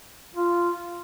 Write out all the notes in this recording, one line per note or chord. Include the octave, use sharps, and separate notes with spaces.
F4